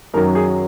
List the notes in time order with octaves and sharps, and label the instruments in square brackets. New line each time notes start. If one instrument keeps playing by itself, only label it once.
[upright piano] F#2 D#3 F#3 A#4
G#4